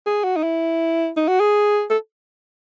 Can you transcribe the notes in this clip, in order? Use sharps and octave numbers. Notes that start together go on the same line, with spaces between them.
G#4
F#4
D#4
E4
D#4
F#4
G#4
A4